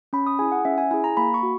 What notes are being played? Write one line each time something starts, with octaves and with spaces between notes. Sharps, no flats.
C#4 B5
D#6
E4 G#4 G#5
F#5
C#4 E5
G#5
E4 G#4 G#5
A#5
A#3 B5
C#6
F#4